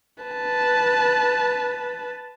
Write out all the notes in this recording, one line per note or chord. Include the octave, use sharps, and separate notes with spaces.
B4 A5